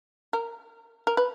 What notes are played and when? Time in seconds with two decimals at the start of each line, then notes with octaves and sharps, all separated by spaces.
0.33 A#4
1.07 A#4
1.17 B4